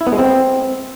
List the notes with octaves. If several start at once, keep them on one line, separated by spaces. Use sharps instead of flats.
E4
B3
G#3
C4